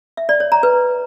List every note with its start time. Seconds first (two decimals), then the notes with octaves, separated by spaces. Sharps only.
0.17 E5
0.29 D5
0.40 C#5
0.52 A#5
0.63 B4